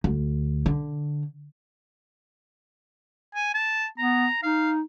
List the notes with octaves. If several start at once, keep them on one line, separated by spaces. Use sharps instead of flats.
D2
D3
G#5
A5
B3 A#5
D#4 F5